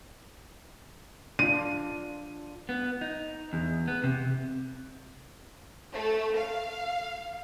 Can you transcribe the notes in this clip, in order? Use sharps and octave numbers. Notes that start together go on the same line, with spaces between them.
D4 F4 D#7
B3
D#4
E2
B3
C3
A3
F5